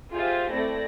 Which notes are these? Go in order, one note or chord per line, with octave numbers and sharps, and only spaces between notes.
F4 G4 G#4 C5 E5 F5
A3 C4 E4 D5 A#6